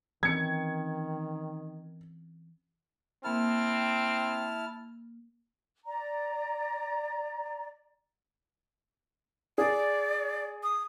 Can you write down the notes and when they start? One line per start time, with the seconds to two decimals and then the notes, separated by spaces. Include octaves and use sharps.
0.23 D#3 E3 C4 C#4 G#6 C#7
3.24 A#3 C4 E4 A#4 A5 F6
5.86 D5 A#5
9.58 G#4 D5
10.63 D#6